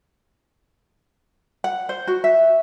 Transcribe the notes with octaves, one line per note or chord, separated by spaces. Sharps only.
F#5
C5
F#4
E5